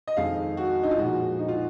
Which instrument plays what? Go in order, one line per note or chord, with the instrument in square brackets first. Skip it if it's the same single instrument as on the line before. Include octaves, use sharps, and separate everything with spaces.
[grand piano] D#5
F2 D#3 G#3 F5
F#4
D#4
F4
A#2 F3 G#3 F#4
D#4
F4